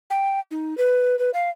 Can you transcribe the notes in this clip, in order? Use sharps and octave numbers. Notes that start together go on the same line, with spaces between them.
G5
D#4
B4
B4
F5